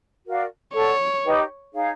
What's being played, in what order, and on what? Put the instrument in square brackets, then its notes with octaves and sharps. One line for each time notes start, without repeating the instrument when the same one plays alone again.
[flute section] F#4 A#4 D5 F5
[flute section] A4 D5 F#5 [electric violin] C#5
[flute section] D#4 G4 B4 D#5
D#4 G#4 C#5 F5